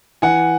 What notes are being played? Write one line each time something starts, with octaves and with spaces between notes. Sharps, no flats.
E3 F#5 G#5